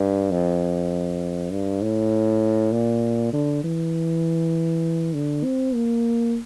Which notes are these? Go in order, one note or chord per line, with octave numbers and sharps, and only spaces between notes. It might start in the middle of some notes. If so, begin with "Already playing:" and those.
Already playing: G2
F2
G2
A2
A#2
D3
E3
D3
C4
A#3